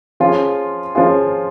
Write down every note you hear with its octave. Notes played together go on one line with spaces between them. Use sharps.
F3 C#4 F4 G#4
F3 C#4 F4 G#4